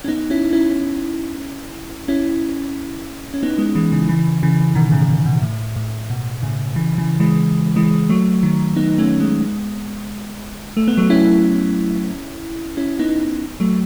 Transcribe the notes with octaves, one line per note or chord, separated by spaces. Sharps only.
C#4
B3 D#4
C#4 E4
C#4 E4
C#4 E4
C#4
B3 D#4
G#3 B3
E3 G#3
C#3 E3
C#3 E3
C#3 E3
B2 D#3
A2 C#3
B2
B2
A2
A2
B2
A2 C#3
C#3 E3
C#3 E3
E3 G#3
E3 G#3
F#3 A3
D#3 F#3
B3 D#4
A3 C#4
G#3 B3
A3
B3
F#3 A3
C#4 E4
C#4 E4
B3 D#4
F#3 A3